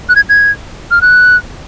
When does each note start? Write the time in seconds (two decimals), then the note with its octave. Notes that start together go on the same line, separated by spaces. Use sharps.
0.09 F#6
0.16 G#6
0.29 G#6
0.91 F6
1.02 F#6